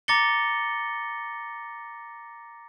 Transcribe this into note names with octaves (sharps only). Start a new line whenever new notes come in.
A#5 D6 A6 A#6 C#7 G7